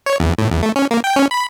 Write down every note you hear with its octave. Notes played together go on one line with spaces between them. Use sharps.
C#5
E2
A2
E2
A3
C#4
A#3
G5
C#4
B5